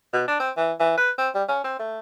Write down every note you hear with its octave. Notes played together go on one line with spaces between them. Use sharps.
B2
D4
C4
E3
E3
B4
C4
G3
C#4
C4
A3